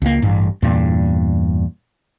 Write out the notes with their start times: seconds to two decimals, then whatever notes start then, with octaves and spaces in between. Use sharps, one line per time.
0.02 C#2 A#3
0.22 A1 G2
0.62 E2 G2 A#2